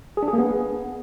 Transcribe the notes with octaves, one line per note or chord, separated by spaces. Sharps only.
G#4
D4
G#4
A#3
B3